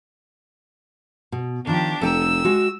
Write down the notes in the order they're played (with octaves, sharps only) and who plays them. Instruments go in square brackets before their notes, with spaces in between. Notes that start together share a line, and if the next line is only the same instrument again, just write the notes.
[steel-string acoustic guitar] B2
[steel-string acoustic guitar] D#3 F3 [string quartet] D4 G4
[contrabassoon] F1 [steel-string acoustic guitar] A4 G5 A#5 [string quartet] E6
[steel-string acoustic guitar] G#3 F#4